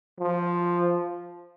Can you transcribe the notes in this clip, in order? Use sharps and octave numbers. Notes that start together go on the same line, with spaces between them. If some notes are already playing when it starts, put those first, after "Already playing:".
F3